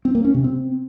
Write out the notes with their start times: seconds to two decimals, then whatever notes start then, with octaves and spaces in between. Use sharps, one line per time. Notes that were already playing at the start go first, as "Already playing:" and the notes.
0.05 C4
0.15 A#3
0.25 C#4
0.34 C3
0.44 C4